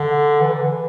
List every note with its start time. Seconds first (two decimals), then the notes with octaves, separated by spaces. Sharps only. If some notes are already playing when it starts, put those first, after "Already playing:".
Already playing: D3
0.41 E3
0.52 D3
0.63 E3